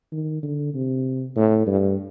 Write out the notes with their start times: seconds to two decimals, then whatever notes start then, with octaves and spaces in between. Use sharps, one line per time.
0.12 D#3
0.43 D3
0.74 C3
1.36 A2
1.67 G2